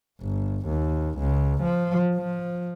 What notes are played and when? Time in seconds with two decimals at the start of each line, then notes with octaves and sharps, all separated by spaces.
0.21 G1
0.67 D#2
1.19 C#2
1.63 F3
2.15 F3